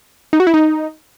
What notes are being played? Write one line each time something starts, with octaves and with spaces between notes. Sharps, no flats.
D#4
F#4
E4
D#4